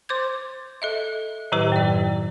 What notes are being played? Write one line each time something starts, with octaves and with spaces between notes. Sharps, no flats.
C5 C6 D6 G6 G#6
A4 D#5 E5
A2 D#3 F#3 E4 G4 B4
F#2 A2 D5